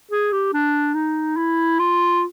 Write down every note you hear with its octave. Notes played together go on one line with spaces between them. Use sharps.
G#4
G4
D4
D#4
E4
F4